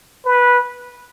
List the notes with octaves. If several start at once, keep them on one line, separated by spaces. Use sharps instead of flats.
B4